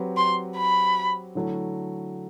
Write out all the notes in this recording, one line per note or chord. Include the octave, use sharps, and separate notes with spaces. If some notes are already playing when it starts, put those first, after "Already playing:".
Already playing: F#3 C4 G4 B4
C6
B5
D3 F#3 A3 E4